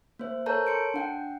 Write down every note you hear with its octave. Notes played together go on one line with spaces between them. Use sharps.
A#3 C5
A4 A#4 C#5 A5 A#5 G6
A5 C6 C#7 D7
D4 F#5 G5